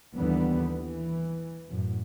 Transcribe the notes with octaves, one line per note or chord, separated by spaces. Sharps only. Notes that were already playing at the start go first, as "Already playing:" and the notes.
D#2 D3 E3 G3 B3
E3
F#2 A2